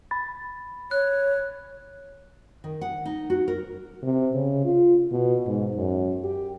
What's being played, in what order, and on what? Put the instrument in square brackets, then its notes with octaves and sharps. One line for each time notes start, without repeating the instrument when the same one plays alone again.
[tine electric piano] B5 A6
[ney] C#5 [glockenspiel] F#6
[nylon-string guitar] D#3
F#5
D#4
F#4
A#4
[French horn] C3
C#3
F4
B2
G#2
F#2
G4